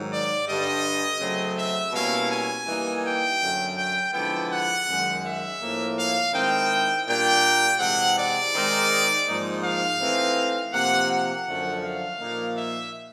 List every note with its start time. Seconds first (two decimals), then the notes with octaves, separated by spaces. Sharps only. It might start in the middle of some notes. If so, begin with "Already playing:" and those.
Already playing: G#2 D#3 F#3
0.09 D5
0.46 G2 D3 G3 D#5
1.19 C#3 F#3 A3 C4
1.56 E5
1.92 B2 G3 A#3 C#4 E4 F5
2.29 G#5
2.65 E3 G3 A#3 D#4
3.03 G5
3.40 F#2 D3 F#3 A3
3.76 G5
4.12 D3 F3 G#3 B3 E4 G5
4.49 F#5
4.86 F#2 D#3 G#3
5.23 E5
5.59 A2 F3 A#3
5.96 F5
6.33 D#3 G#3 C4 E4 G5
7.07 A#2 G3 A#3 D4 G5
7.79 C3 E3 G#3 C4 F#5
8.16 D5
8.52 D#3 G#3 C4 D#4
9.26 G#2 F3 A#3 D#4
9.62 F5
10.00 E3 A3 C4 D#4
10.73 C3 F3 A#3 F#5
11.09 F#5
11.46 F#2 D3 F3 A3
11.83 F5
12.20 A#2 F3 A#3 D#4
12.56 E5